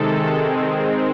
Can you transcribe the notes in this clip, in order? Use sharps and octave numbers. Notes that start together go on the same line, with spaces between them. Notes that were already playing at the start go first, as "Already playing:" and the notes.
Already playing: C3 D#3 G#3 A4
D#3 G#3 C4 G#4